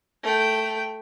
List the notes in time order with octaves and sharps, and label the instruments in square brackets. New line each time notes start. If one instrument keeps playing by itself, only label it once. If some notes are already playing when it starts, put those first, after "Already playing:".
[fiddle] A3 G5